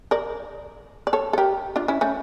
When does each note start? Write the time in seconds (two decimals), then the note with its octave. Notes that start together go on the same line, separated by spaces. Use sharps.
0.11 A#4 D5
1.07 D5
1.13 A4 C#5
1.33 A4
1.38 G4 A#4
1.76 D4 F4
1.88 C#4 E4
2.01 A3 C#4